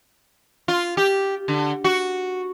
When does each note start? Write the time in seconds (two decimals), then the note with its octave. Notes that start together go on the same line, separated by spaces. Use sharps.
0.68 F4
0.97 G4
1.48 D3
1.84 F#4